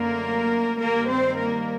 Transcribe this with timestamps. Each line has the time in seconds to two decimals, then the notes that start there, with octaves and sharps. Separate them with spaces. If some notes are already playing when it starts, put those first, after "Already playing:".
Already playing: F#2 D3 A3 A#3 A#4
0.79 G2 D#3 G3 A#3 A#4
1.08 C4 C5
1.38 A#3 A#4